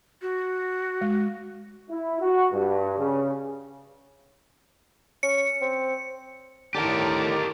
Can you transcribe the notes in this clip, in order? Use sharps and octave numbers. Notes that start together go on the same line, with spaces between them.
F#4
G#3
E4
F#4
G2
C#3
C#4 C#7
C4
A2 D3 D#3 G4 A#4 A5 A#5 D6